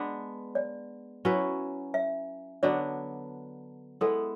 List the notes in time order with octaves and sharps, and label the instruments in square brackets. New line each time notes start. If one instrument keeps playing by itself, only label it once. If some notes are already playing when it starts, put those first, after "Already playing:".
Already playing: [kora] G#3 B3 D4 [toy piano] D5
[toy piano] D5
[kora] F#3 C#4 E4 B4
[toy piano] E5
[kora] D3 F#3 B3 D4 [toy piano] D5
[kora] G#3 B3 E4 [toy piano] A4